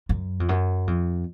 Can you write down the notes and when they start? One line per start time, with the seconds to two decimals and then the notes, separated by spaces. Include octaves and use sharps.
0.09 F#2
0.40 F2
0.49 F#2
0.87 F2